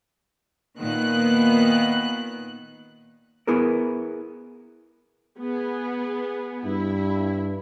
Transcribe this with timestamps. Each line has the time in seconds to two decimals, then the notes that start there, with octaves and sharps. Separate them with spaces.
0.79 A#2 D#3 B3 F#6
3.47 B3 E4 G#4 A#4
5.38 B3 G#4
6.65 G2 E4